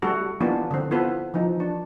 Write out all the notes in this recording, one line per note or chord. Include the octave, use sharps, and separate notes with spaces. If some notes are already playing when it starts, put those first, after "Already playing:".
G3 A3 C#4 F#4 A4
E3 A#3 B3 C#4 D4 F4
D3 C4
B3 E4 F4 A4 B4 C5
E3 F3 D#4
D4